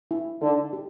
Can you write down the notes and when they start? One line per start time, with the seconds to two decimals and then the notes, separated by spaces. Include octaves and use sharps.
0.11 E4
0.41 D3 D#4
0.73 G4